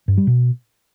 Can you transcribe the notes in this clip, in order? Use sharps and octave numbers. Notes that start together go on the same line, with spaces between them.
G2
G3
B2